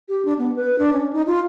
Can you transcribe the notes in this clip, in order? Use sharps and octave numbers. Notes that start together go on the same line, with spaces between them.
G4
D4
B3
B4
D4
C#4
D#4
F4